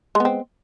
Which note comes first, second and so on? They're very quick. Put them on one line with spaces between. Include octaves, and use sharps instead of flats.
G#3 B3 C4